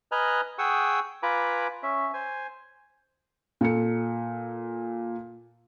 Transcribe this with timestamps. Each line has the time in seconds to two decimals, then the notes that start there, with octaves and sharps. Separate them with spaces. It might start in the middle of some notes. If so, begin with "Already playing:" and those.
0.12 B4 D#5 G#5 A#5 F6 F#6
0.58 G#4 F#5 G5 C#6 D#6 E6
1.23 F4 B4 G#5 A#5 B5 D6
1.83 C#4 E5
2.14 C5 G#5
3.61 A#2 A4 C#7